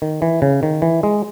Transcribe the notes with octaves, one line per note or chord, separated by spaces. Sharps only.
D#3
E3
C#3
D#3
E3
G#3